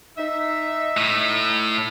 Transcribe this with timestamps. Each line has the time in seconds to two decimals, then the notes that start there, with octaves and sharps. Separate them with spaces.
0.18 D#4 E5
0.97 A2